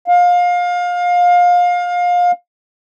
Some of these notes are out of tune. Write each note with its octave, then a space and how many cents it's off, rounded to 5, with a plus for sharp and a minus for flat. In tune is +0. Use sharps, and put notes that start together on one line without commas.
F5 +25